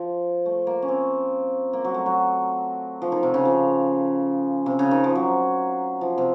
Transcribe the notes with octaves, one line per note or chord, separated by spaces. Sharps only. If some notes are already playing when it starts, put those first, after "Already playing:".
Already playing: F3
A3
A#3
C#4
C4
A#3
F#3
A3
F#3
F3
D#3
C3
C#3
F3
C3
C#3
D#3
F3
F#3
F3
C3